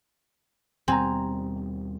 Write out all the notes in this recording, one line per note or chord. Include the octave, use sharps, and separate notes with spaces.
D#2 B2 G3 C4 G#5 A#5